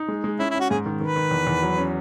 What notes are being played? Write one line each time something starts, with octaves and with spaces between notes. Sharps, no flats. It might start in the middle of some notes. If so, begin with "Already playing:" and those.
Already playing: D#4
G#3
G#3
C#4 E4
E4
C#4
F#4
G#2 G#4
D#3
D#3 B4
D#3
E2
E2
F#3
C#4